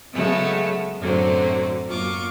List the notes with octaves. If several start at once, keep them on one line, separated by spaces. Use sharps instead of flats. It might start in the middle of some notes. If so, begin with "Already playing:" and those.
C#3 F#3 G#3 A3 B3
F#2 A2 D3 F#3 C4
F#2 A#3 F4 C#6 D6